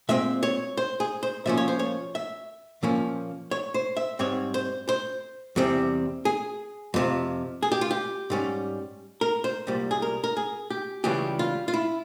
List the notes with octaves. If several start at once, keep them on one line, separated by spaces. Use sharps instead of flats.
A#2 G#3 C4 E5
C#5
C5
G#4
C5
A#2 F3 A#3 C#4 E5
C#5
C5
C#5
E5
A#2 F3 A#3 C#4
C#5
C5
E5
G#2 G3 C4 C#5
C5
C5
E2 C3 G3 C4
G#4
F2 C3 F3
G#4
G4
F4
G4
G#2 G3 C#4
A#4
C5
C2 A#2 G3
G#4
A#4
A#4
G#4
G4
C#2 C#3 E3 G3 C#4 G4
F4
F4
E4